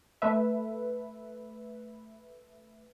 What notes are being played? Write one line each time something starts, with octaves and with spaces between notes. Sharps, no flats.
A3 B4 E5